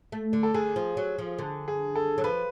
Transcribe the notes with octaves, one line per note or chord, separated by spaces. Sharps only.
A3
D3
A4
D3 G#4
F3
F#3
F3
D3
G#4
A4
F#3
F3 B4